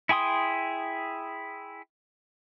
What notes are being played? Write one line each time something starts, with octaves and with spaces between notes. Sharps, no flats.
E4 G#4 G5 C6 D#6